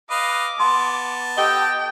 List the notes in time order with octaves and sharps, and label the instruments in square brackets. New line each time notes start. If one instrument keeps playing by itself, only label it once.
[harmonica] B4 D#5 F5 [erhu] D6
[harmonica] B3 A5 [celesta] C6
[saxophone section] G4 A4 D#5 [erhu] G5 [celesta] G7